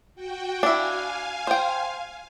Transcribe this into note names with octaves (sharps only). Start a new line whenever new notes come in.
F#4 G5
D4 E4 F5 G#5
C5 G5